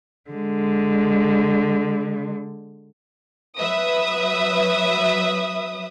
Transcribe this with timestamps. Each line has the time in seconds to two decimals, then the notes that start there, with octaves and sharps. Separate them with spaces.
0.30 D3 G#3
3.58 F#3 B4 E5 D#6